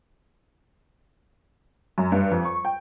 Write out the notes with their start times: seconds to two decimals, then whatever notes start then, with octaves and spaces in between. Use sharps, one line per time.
1.98 F#2
2.12 G2
2.31 F2
2.45 C#6
2.65 G5